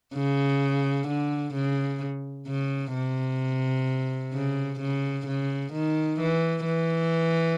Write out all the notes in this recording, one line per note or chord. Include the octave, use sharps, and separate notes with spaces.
C#3
D3
C#3
C#3
C3
C#3
C#3
C#3
D#3
E3
E3